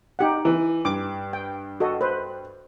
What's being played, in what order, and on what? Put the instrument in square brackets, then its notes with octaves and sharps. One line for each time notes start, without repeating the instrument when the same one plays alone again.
[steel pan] D#4 G4 F#5
[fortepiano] E3
[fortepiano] G2 [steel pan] D6
[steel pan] G5
F#4 A4 D#5
B4 C5